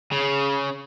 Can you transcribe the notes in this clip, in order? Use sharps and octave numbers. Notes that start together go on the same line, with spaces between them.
C#3